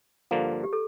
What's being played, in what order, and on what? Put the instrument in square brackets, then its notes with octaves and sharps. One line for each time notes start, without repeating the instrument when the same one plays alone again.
[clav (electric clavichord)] G2 D3 F3 A#3
[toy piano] G4
A4